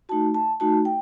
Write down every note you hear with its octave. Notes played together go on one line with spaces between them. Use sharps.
A3 D#4 F#4 A5
A5
A3 D#4 F#4 A5
G5